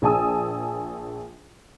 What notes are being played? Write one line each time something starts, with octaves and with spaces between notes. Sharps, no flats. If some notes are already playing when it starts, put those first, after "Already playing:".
A#1 G#4 G#5 A5 D#6 E6